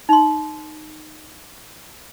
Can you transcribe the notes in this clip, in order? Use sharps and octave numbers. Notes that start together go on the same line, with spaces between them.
D#4 C6